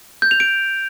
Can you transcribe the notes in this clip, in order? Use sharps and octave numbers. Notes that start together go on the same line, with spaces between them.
G6
F7
D7